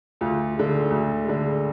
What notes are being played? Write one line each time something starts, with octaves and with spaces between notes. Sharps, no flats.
D2 F4
D3 G#3
D2
D3 G#3